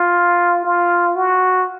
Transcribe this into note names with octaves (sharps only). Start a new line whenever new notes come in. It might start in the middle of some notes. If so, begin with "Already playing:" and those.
Already playing: F4
F4
F#4